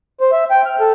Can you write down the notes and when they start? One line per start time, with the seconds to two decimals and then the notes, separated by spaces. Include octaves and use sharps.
0.21 C5
0.32 E5
0.51 G5
0.66 F6
0.80 A4